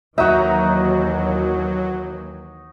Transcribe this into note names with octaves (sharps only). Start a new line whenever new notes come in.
D#2 E3 F#3 D#4 F#4 E5 A#5